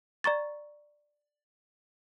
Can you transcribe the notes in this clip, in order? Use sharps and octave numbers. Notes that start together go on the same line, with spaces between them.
D5 A#5 C#6 A6